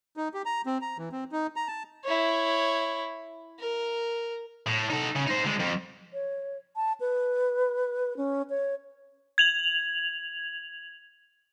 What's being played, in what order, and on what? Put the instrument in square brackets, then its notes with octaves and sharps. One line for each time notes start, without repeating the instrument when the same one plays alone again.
[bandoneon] D#4
G4
A#5
C4
A#5
E3
C4
D#4
A#5
A5
[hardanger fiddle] E4 C#5
A#4
[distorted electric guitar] A2
D#4 A4
C#3
D#4 C5
D3 G#3
F2
[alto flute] C#5
A5
B4
C#4
C#5
[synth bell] G#6 F7 F#7